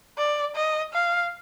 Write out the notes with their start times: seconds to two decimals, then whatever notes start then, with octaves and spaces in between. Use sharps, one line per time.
0.18 D5
0.55 D#5
0.93 F5